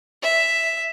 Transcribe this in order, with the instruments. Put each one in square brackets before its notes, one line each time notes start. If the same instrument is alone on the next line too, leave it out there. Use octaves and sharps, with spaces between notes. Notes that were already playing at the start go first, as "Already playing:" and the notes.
[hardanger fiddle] E5